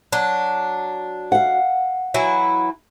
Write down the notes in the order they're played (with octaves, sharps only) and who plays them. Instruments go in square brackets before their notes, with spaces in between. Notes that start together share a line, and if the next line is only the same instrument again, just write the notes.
[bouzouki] F#3 D4
[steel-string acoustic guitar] F5 F#5
[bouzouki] E3 F#3 E4